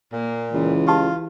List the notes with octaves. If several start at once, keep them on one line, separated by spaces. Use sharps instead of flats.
A#2 A#3
C#2 E3
F4 G4 A5